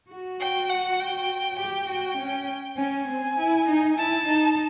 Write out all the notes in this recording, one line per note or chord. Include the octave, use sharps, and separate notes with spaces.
F#4
G5
F#5
G5
G4 G5
F#4
C#4
C#4 G#5
C4
E4
D#4
E4 A5
D#4